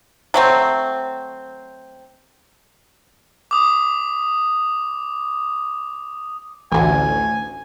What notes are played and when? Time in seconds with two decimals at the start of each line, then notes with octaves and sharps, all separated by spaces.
0.34 F#3 A3 C4
3.51 D6 D#6
6.72 A1 D2 G#5